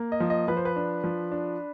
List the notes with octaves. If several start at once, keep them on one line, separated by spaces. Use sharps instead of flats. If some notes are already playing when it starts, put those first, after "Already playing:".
Already playing: A#3
D#5
F3
D#5
F3 B4
C5
B4
D4
F3
D4